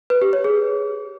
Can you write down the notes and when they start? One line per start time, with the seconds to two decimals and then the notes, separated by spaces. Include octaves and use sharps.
0.10 B4
0.22 G4
0.33 C#5
0.44 G#4